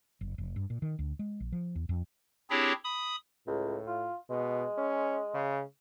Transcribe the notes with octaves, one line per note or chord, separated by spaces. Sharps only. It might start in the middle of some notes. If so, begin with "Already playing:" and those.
F#1
F1
G2
A#2
D#3
D2
G#3
A#1
F3
E2
F2
C4 D4 E4 G4 G#4 C#5
B5 D#6
C#2 A2
F4
B2 G#3
C#4
C#3